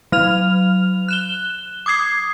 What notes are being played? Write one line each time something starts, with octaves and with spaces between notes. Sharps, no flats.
F#3 F6 F7
F#6 E7 G7
D6 D#6 G#6 C7